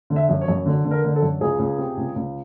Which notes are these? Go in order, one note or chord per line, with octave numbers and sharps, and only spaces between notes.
D3
E5
F#2
C#5
F#2
D3
D3
A#4
D3
A4
F#2
C#2 G#4
C#2
C3
C#2
C#2